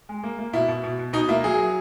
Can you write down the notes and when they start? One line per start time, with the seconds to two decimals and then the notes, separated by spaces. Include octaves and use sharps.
0.09 G#3
0.23 A#3
0.39 A#3
0.53 B2 E4
0.68 B2
0.84 B2
0.99 B2
1.13 B2 D#4
1.29 A#3 E4
1.44 F#3 G#4